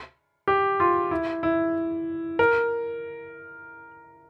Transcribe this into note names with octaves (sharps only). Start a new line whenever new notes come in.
G4
F4
E4
E4
A#4